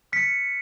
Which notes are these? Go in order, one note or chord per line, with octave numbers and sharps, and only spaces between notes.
F6 B6 C#7